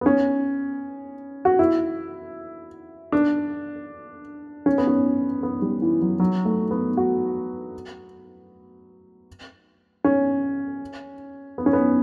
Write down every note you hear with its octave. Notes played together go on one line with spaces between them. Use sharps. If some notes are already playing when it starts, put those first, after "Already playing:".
B3
C#4
F#4
E4
D4
C#4
B3
C#4
B3
G3
E3
F#3
F#3
A3
B3
F#4
C#4
B3
C#4
B3